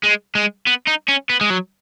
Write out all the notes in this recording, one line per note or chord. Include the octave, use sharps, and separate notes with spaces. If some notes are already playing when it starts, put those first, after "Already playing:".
G#3
G#3
B3
D#4
C#4
B3
G#3
F#3